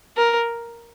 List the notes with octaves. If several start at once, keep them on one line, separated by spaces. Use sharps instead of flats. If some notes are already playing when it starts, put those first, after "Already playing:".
A#4